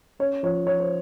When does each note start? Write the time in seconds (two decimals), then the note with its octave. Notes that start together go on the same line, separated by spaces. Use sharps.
0.19 C#4 C#5
0.43 F3 C#5
0.67 F3 C#5
0.80 C5